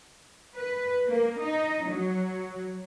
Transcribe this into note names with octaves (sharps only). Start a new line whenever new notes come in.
B4
A#3
D#4
F#3